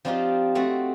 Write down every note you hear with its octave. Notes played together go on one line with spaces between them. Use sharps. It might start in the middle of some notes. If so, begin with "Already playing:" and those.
F3 C4 D4 D#4 F4 G4
A3 C4 F#4 A4